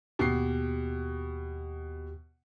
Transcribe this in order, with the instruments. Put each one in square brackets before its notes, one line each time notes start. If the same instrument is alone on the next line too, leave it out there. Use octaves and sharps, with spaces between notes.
[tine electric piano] D#2 G4 [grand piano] B2 C7